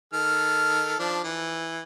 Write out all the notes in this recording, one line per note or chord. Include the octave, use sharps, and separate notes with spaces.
D#3 A4 F6
F3 D4
E3